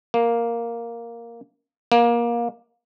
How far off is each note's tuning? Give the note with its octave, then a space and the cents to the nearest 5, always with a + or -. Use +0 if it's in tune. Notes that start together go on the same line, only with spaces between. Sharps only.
A#3 +0
A#3 +20